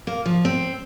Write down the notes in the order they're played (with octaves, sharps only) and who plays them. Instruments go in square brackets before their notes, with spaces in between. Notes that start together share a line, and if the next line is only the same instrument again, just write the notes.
[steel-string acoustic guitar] A#3
F3
C4